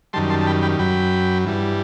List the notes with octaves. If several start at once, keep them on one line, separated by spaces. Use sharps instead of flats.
F#2 D#3 G3 A5 C6
A5 C6
A5
G5 B5
G5 B5
F#2 F#3 G5 B5
G2 E3 G3